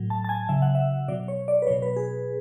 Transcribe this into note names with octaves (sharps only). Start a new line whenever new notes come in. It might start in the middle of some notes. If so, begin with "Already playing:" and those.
Already playing: A2 F#3
A5
A5
G#5
C#3 F#3 E5
F#5
E5
B2 F#3 D5
C#5
D5
B4
B2 F#3 C#5
B4
G#4